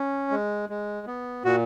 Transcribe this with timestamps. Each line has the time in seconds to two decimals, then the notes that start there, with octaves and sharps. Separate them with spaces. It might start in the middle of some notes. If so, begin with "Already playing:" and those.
Already playing: C#4
0.31 G#3
0.69 G#3
1.07 B3
1.45 A#2 F#4